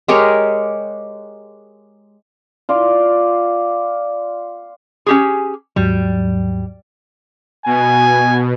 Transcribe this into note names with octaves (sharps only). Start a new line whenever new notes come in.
G#3 G4 A#4 C#5
F4 D5 F5 C6
C#4 G4 G#4
D#2 G#2 F#3 G3
B2 G#5